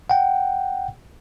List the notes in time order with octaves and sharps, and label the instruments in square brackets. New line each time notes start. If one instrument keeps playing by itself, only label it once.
[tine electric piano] F#5 G5